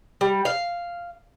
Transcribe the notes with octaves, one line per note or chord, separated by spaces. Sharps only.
G3
F5